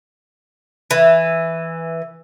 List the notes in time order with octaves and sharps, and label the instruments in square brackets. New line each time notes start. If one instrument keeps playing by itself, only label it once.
[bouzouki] E3